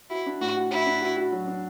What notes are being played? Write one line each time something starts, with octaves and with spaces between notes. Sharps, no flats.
E4 F#4
D4
A2 F#4
F#4
E4 F#4
D4
F#4
F#4
F#3
D4